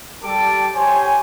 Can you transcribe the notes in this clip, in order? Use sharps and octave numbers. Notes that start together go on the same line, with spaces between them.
G3 G4 A4 A5 D6
G4 C5 C#5 G#5